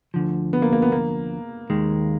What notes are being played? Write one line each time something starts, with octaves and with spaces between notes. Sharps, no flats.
D2 D3 F3
B3
A#3
A#3
B3
A#3
D#2 D#3 G#3